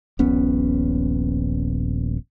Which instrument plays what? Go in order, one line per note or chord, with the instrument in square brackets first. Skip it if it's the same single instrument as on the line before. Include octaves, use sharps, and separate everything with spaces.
[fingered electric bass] D#1 A#1 B3 C#4